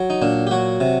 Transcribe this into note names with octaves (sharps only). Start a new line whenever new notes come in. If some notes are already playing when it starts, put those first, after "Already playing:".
Already playing: F#3
D#4
A#2 D4
G4
F#3 F#4
C3